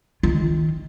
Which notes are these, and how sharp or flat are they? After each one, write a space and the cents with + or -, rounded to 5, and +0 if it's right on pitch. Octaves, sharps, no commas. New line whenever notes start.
D#3 +15 F4 -15